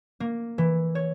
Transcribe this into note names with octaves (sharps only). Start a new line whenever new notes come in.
A#3
E3
C#5